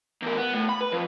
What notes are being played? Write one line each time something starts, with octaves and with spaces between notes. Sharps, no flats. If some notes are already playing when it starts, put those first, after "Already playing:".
E2 A#4
B3
A2
B5
B4
F2